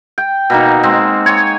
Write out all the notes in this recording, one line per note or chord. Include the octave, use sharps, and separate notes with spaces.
G5
B2 A#3 D#4
G#3 C4
C#5 G#5